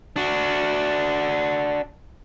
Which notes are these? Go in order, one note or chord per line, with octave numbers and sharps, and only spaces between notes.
D4 F#4